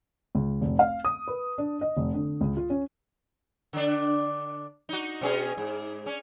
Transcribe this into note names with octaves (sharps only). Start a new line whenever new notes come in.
C#2
F1
F5
D#6
B4
D4
D#5
F1
D3
C#2
F4
C#4
D3 D4
D#4 F#4
B2 C#4 G#4
G#2
C#4